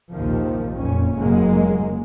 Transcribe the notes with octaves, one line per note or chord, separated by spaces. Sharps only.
A#1 D#2 G#2 C3 D#3 F3
F#1 F2 A#2 C#4
F1 G#2 C#3 F#3 G#3 A#3